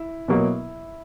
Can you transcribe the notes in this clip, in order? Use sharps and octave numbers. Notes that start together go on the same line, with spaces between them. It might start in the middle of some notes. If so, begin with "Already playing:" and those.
Already playing: E4
B2 F#3 A#3